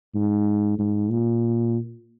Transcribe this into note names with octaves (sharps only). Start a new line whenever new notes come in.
G#2
G#2
A#2